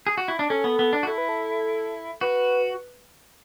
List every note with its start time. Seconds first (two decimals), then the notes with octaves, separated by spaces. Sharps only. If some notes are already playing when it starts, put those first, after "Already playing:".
0.07 G#4
0.18 F#4
0.28 E4
0.39 D4
0.50 C#4 A4
0.64 B3
0.79 B3
0.93 D4
1.03 F#4
1.07 E4 A4
1.18 B4
1.29 A4
2.21 F#4 B4